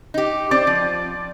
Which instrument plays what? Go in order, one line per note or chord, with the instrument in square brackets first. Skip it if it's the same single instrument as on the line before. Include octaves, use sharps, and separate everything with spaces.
[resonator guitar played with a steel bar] D#4 G4
[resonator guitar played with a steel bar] C4 [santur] D5
[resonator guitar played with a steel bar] F3